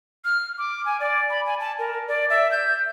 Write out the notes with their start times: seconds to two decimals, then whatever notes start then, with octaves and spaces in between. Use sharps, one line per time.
0.25 F6
0.58 D6
0.85 G#5
1.00 D5
1.30 B5
1.46 G#5
1.60 A5
1.79 A#4
2.08 D5
2.30 E5
2.51 G6